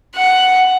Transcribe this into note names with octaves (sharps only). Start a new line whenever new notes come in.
F#5